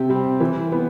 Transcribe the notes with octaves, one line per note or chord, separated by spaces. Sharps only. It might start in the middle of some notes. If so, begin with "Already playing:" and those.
Already playing: C3 G4
G3 C4
E3
B3